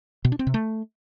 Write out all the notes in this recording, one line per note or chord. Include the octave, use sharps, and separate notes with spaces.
B2
D4
C4
C3
A3